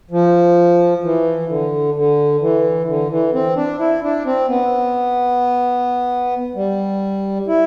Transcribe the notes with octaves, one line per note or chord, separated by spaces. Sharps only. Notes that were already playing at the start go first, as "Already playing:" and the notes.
F3
E3
D3
D3
E3
D3
E3
C4
D4
E4
D4
C4
B3
G3
E4